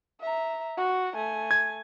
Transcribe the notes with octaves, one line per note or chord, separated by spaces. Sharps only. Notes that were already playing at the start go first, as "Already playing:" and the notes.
E5 A#5
F#4
A3 G#5
G#6